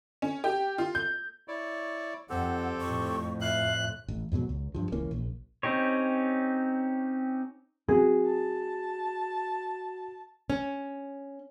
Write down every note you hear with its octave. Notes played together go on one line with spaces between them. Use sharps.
C#4
G4
F4
G6
E4 C#5 D5
F2 C4 G4 A4 F#5
F2 A2 C#6
E5 F5 F#6
A1
F2 G#2 B2 F#3
C#2
G2 F3
C#2 E3 A#3 C#4
A#1
C4 C#4 D#4 G4 C#5
F#3 C4 C#4 F#4 G#4
A5
C#4